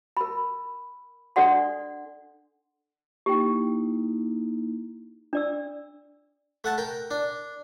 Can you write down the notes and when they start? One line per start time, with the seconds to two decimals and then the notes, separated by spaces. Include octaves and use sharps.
0.17 A#4 B5
1.36 D4 A4 D5 F#5 C6
3.26 A#3 D#4 E4 G4 G5
5.33 D4 D5 E6
6.64 A3 F#5 A5
6.78 A#4 G5
7.11 D4